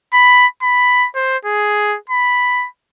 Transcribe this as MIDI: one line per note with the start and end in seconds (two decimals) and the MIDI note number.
0.14 0.47 83
0.62 1.08 83
1.15 1.37 72
1.45 1.98 68
2.10 2.67 83